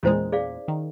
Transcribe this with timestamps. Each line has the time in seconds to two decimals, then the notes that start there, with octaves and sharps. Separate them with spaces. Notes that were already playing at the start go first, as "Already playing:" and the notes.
0.03 E2 A#2 G#3 C#4 E4 C5
0.32 G#4 D5 F5
0.68 D#3